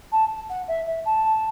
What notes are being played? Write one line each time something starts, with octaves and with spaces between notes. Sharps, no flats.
A5
F#5
E5
E5
A5